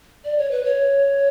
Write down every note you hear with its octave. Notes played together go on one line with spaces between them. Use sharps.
D5
C#5
B4
C#5